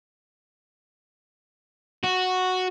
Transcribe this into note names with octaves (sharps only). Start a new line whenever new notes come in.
F#4